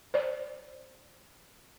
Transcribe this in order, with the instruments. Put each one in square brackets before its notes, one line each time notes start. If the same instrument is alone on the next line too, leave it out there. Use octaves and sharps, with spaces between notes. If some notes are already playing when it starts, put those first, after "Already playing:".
[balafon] C5 D5